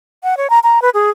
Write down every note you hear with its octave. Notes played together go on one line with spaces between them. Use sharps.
F#5
C#5
A#5
A#5
B4
G#4